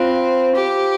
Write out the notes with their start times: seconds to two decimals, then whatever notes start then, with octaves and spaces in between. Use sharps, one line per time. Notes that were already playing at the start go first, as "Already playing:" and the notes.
Already playing: C4 F4 C5 F5
0.56 G4